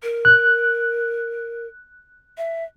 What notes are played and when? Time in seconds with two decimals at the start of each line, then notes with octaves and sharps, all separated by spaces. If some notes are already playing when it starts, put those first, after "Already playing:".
0.03 A#4
0.25 F#6
2.38 E5